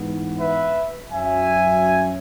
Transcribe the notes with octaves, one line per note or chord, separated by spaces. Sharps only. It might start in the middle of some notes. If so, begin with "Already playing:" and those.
Already playing: G#2 E3 B3
B4 E5
F#2 F#3 C#4 E5 G#5